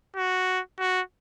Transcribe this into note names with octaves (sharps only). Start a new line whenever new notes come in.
F#4
F#4